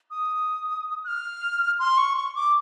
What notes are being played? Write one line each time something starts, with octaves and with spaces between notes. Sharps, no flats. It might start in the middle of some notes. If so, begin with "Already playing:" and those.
D#6
F#6
F6
C6
C#6
C#6
D6